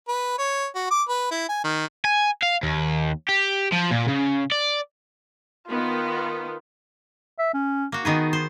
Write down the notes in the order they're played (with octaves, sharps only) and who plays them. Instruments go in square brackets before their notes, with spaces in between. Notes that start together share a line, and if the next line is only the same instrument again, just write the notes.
[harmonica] B4
C#5
F#4
D6
B4
E4
G#5
D#3
[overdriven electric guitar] G#5
F5
D#2
G4
F3
A#2
C#3
D5
[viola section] D#3 B3 [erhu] F4
[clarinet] E5
C#4
[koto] A#3 F#4
[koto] D#3 B3 G#4 [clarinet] D#4
[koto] C5